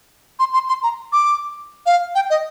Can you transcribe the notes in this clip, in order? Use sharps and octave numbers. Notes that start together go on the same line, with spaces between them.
C6
C6
C6
A#5
D6
F5
G5
D#5